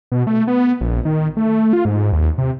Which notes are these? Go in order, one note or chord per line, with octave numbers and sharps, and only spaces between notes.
B2
A3
B3
A#1
D#3
A3
F4
G#2
D#2
C3